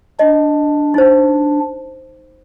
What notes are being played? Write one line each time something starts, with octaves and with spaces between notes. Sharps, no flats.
D4 D#5
D#4 C5